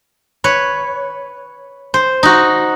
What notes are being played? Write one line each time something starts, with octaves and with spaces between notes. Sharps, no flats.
B4 C#5
C5
D#4 F#4